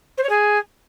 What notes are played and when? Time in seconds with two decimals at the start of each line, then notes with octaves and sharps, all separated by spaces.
0.17 C5
0.23 C#5
0.29 G#4